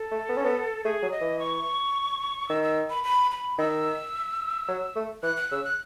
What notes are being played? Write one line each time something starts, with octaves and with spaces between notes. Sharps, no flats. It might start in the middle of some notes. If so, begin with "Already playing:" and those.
Already playing: A4
A3
B3
C#4
B3
A3 G#4
F#3
D#5
E3
C#6
D#3 E6
E6
B5
B5
B5
D#3 E6
F#3
A3
E3 F#6
F#6
C#3 E6
F#6